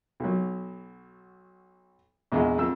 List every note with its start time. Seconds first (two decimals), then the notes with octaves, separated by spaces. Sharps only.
0.20 B1 F#3
2.32 A#1 E2 G#3
2.58 F2 E6